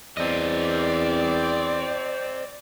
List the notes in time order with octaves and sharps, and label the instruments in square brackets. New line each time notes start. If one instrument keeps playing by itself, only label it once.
[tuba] E2 [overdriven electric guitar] C4 D#5 [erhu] D5